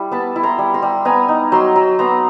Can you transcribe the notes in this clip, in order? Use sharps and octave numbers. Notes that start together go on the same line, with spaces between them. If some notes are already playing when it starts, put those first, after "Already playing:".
Already playing: G3 E4
B3 A5 B5
E4
A#5 C6
G3
A#5 C6
G3
B3 G#5 A#5
D#4
F#3 A#5 C6
F#3
B3 A#5 C6